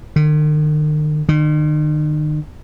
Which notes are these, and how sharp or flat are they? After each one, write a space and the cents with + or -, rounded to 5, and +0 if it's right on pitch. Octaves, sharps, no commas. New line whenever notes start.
D#3 -45
D#3 -40